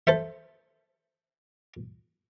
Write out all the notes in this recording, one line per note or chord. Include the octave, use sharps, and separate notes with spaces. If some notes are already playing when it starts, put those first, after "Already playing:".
A4 C5 E5